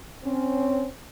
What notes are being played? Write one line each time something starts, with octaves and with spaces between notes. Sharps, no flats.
C4 C#4